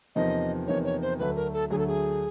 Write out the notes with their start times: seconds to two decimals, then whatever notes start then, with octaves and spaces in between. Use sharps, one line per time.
0.16 E2 C3 F3 A#3 D#4 D#5
0.67 E2 C3 F3 A#3 D#4 C#5
0.84 C#5
1.02 C5
1.19 D2 D3 F#3 A3 B4
1.36 A#4
1.53 A4
1.70 D2 D3 F#3 A3 G#4
1.79 A4
1.87 G#4